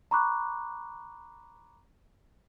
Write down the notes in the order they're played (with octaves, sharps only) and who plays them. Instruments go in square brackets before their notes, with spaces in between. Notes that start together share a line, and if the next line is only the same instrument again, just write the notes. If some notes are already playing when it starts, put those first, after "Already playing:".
[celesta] A#5 B5 C#6 D6 F#6